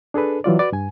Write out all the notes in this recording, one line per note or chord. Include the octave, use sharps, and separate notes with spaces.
D4 G#4 A4 B4
E3 F#3 F4 D5
F#4 B4 D5
G2 G#5